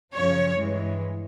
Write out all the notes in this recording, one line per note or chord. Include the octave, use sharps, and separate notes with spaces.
F#2 C#3 F3 C#5
G2 E3 G#3